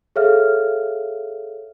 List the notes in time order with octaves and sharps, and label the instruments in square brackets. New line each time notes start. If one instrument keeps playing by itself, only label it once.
[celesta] G#4 A4 C#5 E5 F5 F6